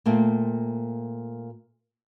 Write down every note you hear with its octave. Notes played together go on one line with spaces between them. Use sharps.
A#2 A3 A#3 C4